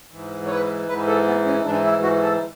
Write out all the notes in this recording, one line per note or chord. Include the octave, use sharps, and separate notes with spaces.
G#2 E3
C#5
B4
G#2 E3 B4
A4
B3
C#4
G#2 E3 D4
E4
F#4
A4